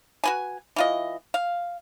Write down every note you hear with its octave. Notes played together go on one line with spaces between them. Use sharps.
F#4 B4 G#5
E3 F4 D#5
F5